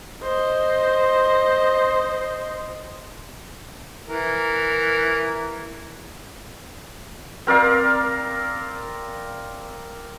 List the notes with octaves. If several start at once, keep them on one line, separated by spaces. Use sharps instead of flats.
C5 D#5
E3 A#4
C4 A#4 D5 F5